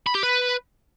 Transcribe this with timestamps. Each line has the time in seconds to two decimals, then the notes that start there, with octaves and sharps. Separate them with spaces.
0.07 B5
0.15 G4
0.23 B4